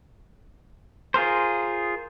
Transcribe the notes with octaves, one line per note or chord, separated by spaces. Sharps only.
F4 G#4 A#4 C5